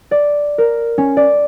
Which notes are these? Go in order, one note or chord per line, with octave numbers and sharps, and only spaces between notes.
D5
A#4
C#4
D5